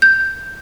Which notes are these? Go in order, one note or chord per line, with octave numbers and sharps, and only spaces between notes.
G6